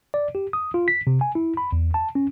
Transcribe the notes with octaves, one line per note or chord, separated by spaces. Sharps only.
D5
G4
D#6
F4
B6
C3
G#5
E4
B5
E2
A5
C#4